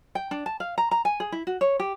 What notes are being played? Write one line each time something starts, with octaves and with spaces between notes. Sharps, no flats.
G5
D4
A5
F5
A#5
A#5
G#5
G#4
E4
F#4
C#5
G4